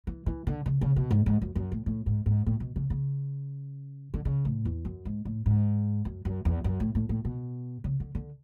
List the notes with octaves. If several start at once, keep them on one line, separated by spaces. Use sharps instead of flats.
E3
E3
D3
C#3
C#3
B2
G#2
G#2
F#2
F#2
A2
A2
G#2
G#2
A2
B2
C#3
C#3
D3
C#3
A2
E2
F#2
G#2
A2
G#2
F#2
F#2
E2
F#2
A2
A2
A2
B2
C#3
D3
D3